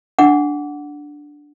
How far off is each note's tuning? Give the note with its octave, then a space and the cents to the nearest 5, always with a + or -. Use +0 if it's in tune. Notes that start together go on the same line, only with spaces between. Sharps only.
D4 +0 F#5 -5 D6 -30